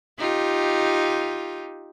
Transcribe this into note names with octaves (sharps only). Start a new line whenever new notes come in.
D#4 F4 G4